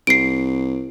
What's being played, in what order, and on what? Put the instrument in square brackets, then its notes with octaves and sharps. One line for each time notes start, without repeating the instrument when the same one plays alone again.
[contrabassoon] C2 [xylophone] C7 D7